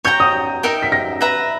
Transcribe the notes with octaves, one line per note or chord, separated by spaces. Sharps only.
C#5 G5 A#5 G6
D#6
D#4 A#4 E5 G5
B6
A#6
B4 E5 A#5